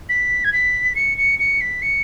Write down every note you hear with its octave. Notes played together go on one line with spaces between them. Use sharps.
B6
G#6
B6
C#7
C#7
C#7
B6
C#7